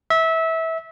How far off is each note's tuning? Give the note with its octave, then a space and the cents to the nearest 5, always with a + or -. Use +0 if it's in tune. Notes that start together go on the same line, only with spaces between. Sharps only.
E5 -20